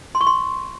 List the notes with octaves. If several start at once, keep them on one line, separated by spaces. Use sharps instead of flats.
C6
C#6
C6